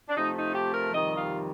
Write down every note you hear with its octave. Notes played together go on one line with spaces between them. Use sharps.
D4
C3 F3 A3 D#4
D#4
G4
A#4
F2 C3 D#3 G3 D#5
F4